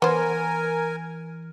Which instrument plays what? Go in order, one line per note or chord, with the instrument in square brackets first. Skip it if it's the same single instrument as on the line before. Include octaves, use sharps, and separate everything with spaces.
[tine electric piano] E3 [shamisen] B3 C5 [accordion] A#4 G#5